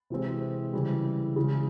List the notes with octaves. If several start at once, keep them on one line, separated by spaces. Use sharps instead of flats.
C3 E3 G#3 C4
C#3 E3 G3
C#3 E3 G#3